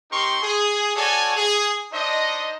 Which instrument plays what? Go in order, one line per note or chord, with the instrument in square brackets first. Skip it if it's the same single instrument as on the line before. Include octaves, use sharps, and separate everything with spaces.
[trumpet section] C4 D#4 G4 A#4 C6 C#6
G#4
F#4 A4 C#5 D5 G#5
G#4
D4 D#4 C5 D#5